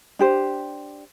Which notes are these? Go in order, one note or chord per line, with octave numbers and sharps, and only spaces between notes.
D4 G4 C5